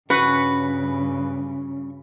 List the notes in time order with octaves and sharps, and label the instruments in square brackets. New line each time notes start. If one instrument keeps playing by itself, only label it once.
[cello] G2 C#3 [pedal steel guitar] C#4 C#6 [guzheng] F#4 F#5 [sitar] B4